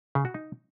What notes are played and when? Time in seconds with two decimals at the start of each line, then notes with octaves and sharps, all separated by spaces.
0.15 C#3
0.25 F#4
0.34 D#4